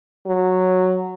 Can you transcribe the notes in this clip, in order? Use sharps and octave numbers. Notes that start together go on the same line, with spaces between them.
F#3